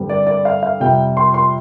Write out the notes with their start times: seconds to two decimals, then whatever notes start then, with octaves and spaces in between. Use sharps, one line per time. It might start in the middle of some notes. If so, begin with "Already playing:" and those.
Already playing: G2 D3 G3 C4
0.09 D5
0.27 D5
0.45 F5
0.63 F5
0.80 F2 C3 G3 G5
1.17 C6
1.34 C6